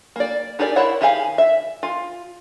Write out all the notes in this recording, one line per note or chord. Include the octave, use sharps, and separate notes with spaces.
A#3 D5
D#4 G4 G#4 A#4 D5
E4 A#4 C5 C#5 F#5
D#3 G4 G#4 F5 G#5
E5
F4